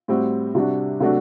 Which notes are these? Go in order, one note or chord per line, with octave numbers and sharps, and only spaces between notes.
A2 G3 C4 F#4
C3 G3 D4 F#4
C3 F#3 A3 D4 F#4